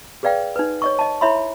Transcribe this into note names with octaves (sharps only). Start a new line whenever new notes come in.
G#4 B4 D5 F5 G5
D#4 B4
C#5 D#5 C#6
D#5 A5
E4 C#5 E5 B5 C6